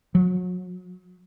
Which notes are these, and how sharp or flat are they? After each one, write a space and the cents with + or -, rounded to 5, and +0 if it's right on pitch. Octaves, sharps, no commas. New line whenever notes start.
F#3 -35